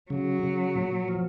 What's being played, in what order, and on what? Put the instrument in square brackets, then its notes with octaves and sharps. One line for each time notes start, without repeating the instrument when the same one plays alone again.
[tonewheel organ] C#3 [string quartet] F#3
[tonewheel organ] C#3
A#2
F3